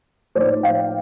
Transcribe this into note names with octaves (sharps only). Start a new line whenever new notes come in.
A2 F3 A#3 D#4 C5 D5
F5 G5